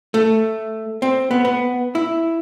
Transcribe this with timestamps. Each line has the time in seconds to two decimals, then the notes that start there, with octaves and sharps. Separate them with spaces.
0.14 A3
1.02 C4
1.31 B3
1.45 B3
1.95 E4